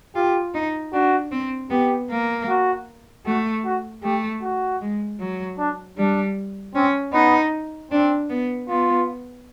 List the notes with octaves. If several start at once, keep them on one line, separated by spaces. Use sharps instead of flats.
F4 G4
D#4
D4 F#4
C4
B3 G4
A#3
F#4
A3 F#4
F#4
A3 G4
F#4
G#3
F#3
D4
G3 D4
C4 C#4
B3 D#4
C4 D4
B3
B3 F4